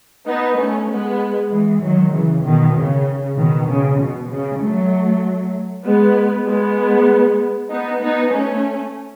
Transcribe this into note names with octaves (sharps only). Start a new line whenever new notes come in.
B3 D#4
A3 C#4
G#3 B3
E3 G#3
D#3 F#3
C#3 E3
B2 D#3
C#3
B2 D#3
C#3
B2
C#3
F#3 A3
G#3 B3
G#3 B3
B3 D#4
B3 D#4
A3 C#4